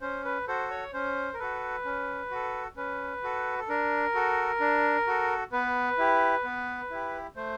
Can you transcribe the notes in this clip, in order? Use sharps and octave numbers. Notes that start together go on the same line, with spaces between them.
C#4 C5
B4
F#4 A4 C5
C#5
C#4 C5
A#4
F#4 A4 B4
C#4
F#4 A4
C#4 B4
F#4 A4
A4
D4 A#4
F#4 A4
D4
F#4 A4
B3 B4
E4 G4
B3
E4 G4
A3 C5